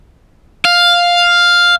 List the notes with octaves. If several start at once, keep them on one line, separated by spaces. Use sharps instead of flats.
F5